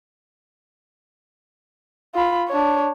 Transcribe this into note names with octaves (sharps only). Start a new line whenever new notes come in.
F4 B5
D4 C#5